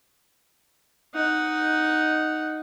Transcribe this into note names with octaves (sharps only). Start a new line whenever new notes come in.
D#4 F#5